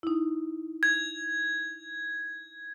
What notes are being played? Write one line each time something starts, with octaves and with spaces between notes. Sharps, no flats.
D#4 E4
G#6